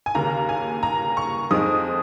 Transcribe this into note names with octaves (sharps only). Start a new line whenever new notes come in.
G#5
D#2 C#3 A#3 A#5
G#5
A#5
C#6
F2 D#3 G#3 D#6